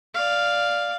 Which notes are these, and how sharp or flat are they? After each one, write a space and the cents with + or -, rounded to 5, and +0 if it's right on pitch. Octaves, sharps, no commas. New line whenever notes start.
D5 +0 F5 +0